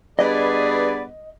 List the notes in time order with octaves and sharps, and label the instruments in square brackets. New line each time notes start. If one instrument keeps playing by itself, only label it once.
[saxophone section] G2 B3 [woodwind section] G#4 B4 D5 [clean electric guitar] D#5